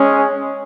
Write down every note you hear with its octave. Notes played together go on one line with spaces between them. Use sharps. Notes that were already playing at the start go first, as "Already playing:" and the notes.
Already playing: G#3 C#4